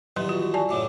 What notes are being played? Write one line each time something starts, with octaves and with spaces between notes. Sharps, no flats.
E2 G2 D#3 F#3 C6
F4 F#4
D5 G#5 A5
F#2 A2 C#3 D6